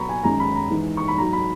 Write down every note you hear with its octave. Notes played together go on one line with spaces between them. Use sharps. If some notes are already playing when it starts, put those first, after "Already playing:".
Already playing: B2 F#3 A#5 B5 C#6
G#5
F#2 D#3 G#3 A#5
B5
A#5
G#2 E3 G#3
C#6
B5
G#2 F#3 A#5
B5